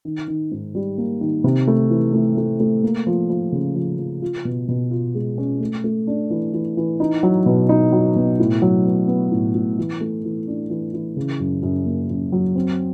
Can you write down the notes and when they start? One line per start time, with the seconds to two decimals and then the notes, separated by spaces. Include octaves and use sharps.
0.05 D#3
0.28 D#3
0.52 G#2
0.75 G3
0.98 A#3
1.21 D#3
1.44 C3
1.67 A3
1.90 E3
2.13 A3
2.37 A3
2.60 A3
2.83 A#3
3.07 F3
3.30 F3
3.53 C#3
3.76 F3
3.99 F3
4.22 F4
4.45 B2
4.69 B2
4.91 F4
5.15 G#3
5.38 C#4
5.60 A3
5.84 A3
6.07 D4
6.30 E3
6.53 E3
6.77 E3
7.00 D#4
7.23 F#3
7.46 B2
7.69 D#4
7.92 F#3
8.16 B2
8.39 A2
8.62 F#3
8.85 B3
9.08 B3
9.31 A2
9.55 A2
9.78 E3
10.01 A3
10.24 E3
10.47 D4
10.70 E3
10.94 E3
11.17 C#3
11.40 F#2
11.63 F#2
11.86 A#3
12.10 F#2
12.32 F#3
12.55 C4